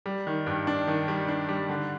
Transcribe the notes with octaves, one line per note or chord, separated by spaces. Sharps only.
G3
D#3
G2
D4
D#3
G3
D4
G3
D3